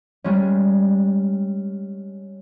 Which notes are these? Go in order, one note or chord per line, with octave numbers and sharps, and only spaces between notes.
G3 G#3 C#4